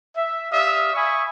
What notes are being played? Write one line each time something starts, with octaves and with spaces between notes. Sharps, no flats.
E5
G4 D5 E5 F5 D#6
E5 G#5 B5 C#6 D#6